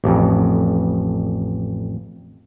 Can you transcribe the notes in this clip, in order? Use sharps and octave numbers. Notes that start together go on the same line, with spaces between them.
A1 F2